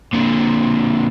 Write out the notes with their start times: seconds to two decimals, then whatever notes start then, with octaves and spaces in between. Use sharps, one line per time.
0.13 A#2 D3